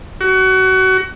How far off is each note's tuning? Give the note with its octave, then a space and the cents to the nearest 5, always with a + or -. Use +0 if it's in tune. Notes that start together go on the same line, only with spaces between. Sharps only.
F#4 +25